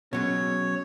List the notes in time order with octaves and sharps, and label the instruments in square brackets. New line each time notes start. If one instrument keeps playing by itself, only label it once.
[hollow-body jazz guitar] B2 F#3 G#3 [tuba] C#4 [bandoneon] C#5